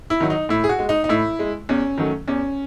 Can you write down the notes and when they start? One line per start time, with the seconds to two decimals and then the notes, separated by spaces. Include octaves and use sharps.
0.10 E4
0.20 D#3 F#3
0.30 D#4
0.49 A2 E4
0.64 G#4
0.69 F#4
0.79 G#3
0.89 D#4
1.04 D#4
1.09 A2 E4
1.39 G#3
1.69 E2 C#4
1.98 D#3 F#3 A3
2.28 E2 C#4